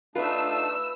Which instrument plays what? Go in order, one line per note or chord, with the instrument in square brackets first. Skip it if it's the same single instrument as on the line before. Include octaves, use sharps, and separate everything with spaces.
[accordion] A3 D4 D#4 [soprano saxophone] F4 [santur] B4 E5 [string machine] E6